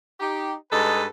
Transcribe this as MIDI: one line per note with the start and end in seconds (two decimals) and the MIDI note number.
0.20 0.53 63
0.20 0.53 67
0.71 1.05 43
0.71 1.05 56
0.71 1.05 63
0.71 1.05 69
0.71 1.05 71